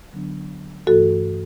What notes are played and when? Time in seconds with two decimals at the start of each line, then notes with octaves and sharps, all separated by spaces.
0.13 D3 F#3 B3 D4
0.87 G2 E3 A3 F#4 A4